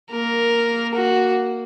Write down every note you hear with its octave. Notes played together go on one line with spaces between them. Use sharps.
A#3 A#4
F#4